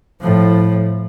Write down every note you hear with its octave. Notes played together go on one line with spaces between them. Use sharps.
A2 F3